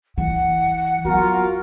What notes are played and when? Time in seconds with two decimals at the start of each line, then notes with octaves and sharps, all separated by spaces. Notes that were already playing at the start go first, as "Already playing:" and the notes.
0.18 E3 F#5
1.05 F#3 B3 F4 F#4 A#4